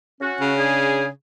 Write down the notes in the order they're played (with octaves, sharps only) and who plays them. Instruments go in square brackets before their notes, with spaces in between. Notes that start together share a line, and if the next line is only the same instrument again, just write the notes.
[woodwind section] C#4 F#4
[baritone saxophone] C#3
[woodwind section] D4 G#4